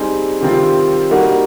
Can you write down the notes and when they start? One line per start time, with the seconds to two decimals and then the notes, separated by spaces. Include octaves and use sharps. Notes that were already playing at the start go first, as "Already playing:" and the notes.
Already playing: G3 C4 D#4 G#4
0.41 C3 D#3 G3 C4 F4
1.10 G3 A#3 D#4 F#4